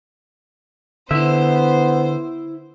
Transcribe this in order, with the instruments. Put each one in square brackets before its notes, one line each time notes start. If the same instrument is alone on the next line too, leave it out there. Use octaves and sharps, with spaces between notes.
[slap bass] D3 [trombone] B3 [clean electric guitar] E4 E5 [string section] C5